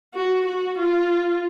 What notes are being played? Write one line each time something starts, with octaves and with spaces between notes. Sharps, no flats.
F#4
F#4
F4